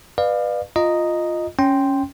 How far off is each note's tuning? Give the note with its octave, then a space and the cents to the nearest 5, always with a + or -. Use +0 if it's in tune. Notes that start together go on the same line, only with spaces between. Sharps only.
B4 +0 D5 +35 F5 +5
F4 +0 D#5 +0 A#5 +0
C#4 +0 G5 +0 C6 +0